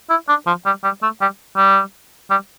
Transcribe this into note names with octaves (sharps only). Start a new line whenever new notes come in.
E4
D4
F3
G3
G3
A3
G3
G3
G3